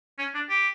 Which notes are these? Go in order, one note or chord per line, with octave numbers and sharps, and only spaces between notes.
C#4
D4
G4